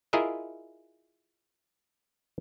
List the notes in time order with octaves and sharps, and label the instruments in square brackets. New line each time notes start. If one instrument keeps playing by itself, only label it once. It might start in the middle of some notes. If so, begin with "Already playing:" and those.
[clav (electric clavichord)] E4 F4 G#4 A#4 D#5 E5